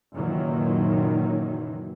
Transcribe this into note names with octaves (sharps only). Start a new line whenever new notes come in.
F#1 A#2 D#3 E3 F#3